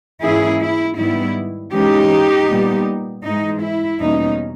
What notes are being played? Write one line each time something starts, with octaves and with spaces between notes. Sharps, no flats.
G#2 E3 A#3 C#4 E4 G#4
E4
G#2 D#3 G3 B3 E4
G#2 E3 G#3 C#4 D#4 G4
A#2 G3 B3
G#2 E3 G#3 D#4
E4
E2 B2 G3 A#3 C#4 D#4